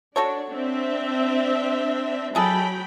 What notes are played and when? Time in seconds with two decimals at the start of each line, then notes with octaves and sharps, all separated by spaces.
0.16 D4 F#4 A4 C#5
0.52 C4 D4 E5
2.35 F#3 G#3 G#4 A4 G5 B5